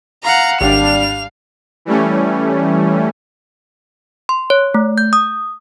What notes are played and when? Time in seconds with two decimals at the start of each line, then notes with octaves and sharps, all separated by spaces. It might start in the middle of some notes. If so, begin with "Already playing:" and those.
0.24 F5 F#5 A#5
0.61 G#1 G3 D4 F5 F7
1.85 E3 G3 A3 C#4
4.29 C6
4.50 C#5
4.74 A3
4.98 G6
5.13 D#6